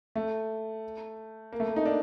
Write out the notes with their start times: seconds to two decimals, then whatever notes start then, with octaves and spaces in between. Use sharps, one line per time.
0.16 A3
1.53 A#3
1.60 A3
1.68 A#3
1.76 D#4
1.85 A#3 D4